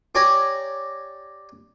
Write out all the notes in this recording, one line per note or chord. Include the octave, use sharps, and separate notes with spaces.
G4 C#5 D5 G#5 A#5